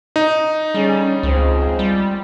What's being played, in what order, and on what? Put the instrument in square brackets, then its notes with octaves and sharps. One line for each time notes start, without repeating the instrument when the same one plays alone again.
[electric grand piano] D#4
[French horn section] D3 C#4 G#4 [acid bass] G3
[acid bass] C#2 [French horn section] F3 G#3 C4
[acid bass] G3